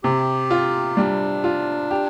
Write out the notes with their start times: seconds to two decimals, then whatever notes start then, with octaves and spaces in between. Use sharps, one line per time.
0.04 C3 G4
0.51 F4
0.97 G3 D4
1.44 F4
1.91 G4